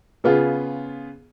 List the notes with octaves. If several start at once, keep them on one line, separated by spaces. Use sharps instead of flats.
C#3 B3 F4 G#4